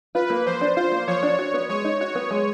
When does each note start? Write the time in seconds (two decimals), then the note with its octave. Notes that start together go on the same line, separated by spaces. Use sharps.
0.15 F4 B4
0.30 A#3
0.46 F3 C5
0.61 D4
0.76 F4 C5
0.92 A#3
1.08 F3 C#5
1.23 D4
1.39 F#4
1.54 B3
1.69 G#3 C#5
1.84 D#4
2.00 F#4 C#5
2.15 B3
2.31 G#3